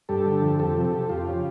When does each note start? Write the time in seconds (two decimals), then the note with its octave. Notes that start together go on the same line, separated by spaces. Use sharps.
0.09 G2 G4 A4
0.26 D3
0.42 F3
0.59 F2 G4 A4
0.77 C3
0.85 G4 A4
0.93 F3
1.09 F2 F4 G4
1.27 C#3